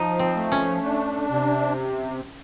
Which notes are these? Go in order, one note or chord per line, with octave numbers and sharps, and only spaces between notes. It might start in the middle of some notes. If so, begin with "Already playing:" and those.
Already playing: F3 D#4
C4
A3
C#4
D4
C3